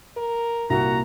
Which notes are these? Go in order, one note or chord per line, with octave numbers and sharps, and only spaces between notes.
A#4
C2 A#2 A#3 F#4 A#5